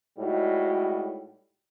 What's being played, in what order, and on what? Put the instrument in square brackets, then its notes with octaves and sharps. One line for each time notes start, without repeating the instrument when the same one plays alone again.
[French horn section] A2 G3 G#3 D#4 F#4